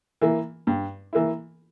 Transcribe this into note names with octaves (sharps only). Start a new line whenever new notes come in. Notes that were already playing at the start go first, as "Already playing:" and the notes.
E3 A#3 E4
G2
E3 A#3 E4